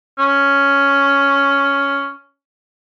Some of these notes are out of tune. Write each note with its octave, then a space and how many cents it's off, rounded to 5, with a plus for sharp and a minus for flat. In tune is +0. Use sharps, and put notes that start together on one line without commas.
C#4 +5